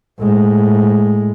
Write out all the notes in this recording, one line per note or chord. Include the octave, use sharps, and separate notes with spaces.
A2 G#3